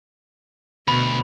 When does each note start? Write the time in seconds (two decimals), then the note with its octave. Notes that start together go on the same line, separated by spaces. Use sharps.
0.88 D2 B2 B5